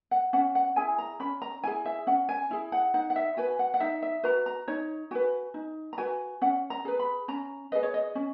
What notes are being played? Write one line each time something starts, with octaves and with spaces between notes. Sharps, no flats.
F#5
C#4 F#5
F#5
E4 G#4 G#5
A#5
C#4 B5
A#5
E4 G#4 G#5
E5
C#4 F#5
G#5
E4 G#4
F#5
D#4 F#5
F#5
E5
F#4 B4 G#5
F#5
F#5
D#4 E5
E5
F#4 B4 A#5
A#5
D#4 C#5
F#4 B4 G#5
D#4
A#5
F#4 B4 G#5
C#4 F#5
A#5
G#4 B4
B5
C#4 A#5
G#4 B4 D#5
C#5
D#5
C#4